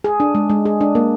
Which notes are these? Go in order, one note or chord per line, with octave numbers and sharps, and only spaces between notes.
G#4
D4
G#3
G#3
G#4
D4
A#3